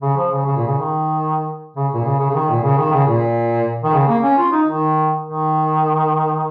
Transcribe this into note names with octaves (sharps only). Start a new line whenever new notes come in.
C#3
F3
C#3
C#3
A#2
C#3
D#3
C#3
A#2
C#3
C#3
C#3
D#3
A#2
C#3
D#3
C#3
A#2
D#3
C#3
A#3
C#4
F4
D#4
D#3
D#3